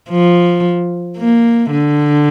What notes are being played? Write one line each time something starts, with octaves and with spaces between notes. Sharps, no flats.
F3
A#3
D3